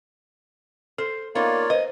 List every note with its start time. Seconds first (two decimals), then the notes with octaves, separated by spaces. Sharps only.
0.98 A4 C5
1.35 A#3 B3 D#4 F4 C#5 D5
1.70 B4 C5 D#5